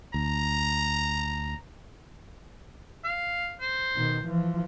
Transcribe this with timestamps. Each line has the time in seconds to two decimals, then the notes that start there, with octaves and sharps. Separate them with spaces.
0.14 D2 A#5
3.04 F5
3.61 C5
3.96 B2 D#3
4.25 E3 F3